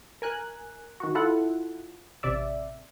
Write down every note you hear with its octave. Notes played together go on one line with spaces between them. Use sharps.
A#4 G#5 F#6
D#3 F#4
E4 F4 A4 F#5
A1 C3 D5 E5